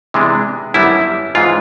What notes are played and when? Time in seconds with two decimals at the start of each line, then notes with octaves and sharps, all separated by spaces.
0.14 C3 E3 G#3 B3 D4
0.74 F#2 D3 G3 B3 E4
1.35 G#2 E3 G#3 C#4 F4